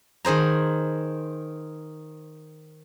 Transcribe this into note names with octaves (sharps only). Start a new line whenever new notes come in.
D#3 G#4 C5 A#5